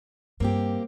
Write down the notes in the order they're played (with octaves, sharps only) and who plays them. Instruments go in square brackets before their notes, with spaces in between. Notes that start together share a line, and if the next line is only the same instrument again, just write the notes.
[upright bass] G2 [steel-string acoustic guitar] A#3 C4 G4